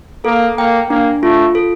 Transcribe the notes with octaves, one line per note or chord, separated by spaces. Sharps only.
A#3 A4
A#3 G5
A#3 D4
A3 F4
A4